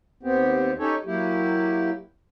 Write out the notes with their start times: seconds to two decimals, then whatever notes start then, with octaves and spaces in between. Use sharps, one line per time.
0.23 D#2 B3 C4 G4
0.79 C#4 D#4 G4 A4 C#5
1.06 F#3 A#3 E4 G4